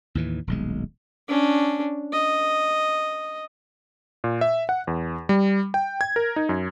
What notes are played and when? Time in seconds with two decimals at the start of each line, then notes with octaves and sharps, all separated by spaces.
0.15 D#2 A2 E3
0.47 D#1 B1 G#3
1.28 C#4 D4
2.13 D#5
4.24 A#2
4.41 E5
4.69 F#5
4.87 E2
5.29 G3
5.74 G5
6.01 G#6
6.16 A#4
6.36 D#4
6.49 F#2